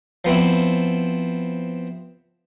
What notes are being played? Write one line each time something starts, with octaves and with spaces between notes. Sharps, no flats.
F3 B3 C4 E4